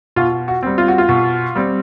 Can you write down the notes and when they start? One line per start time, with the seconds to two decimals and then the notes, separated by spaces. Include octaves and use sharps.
0.16 B2 F4
0.48 F#4
0.63 G3 C4
0.78 F4
0.88 F#4
0.98 F4
1.09 B2
1.55 G3 C4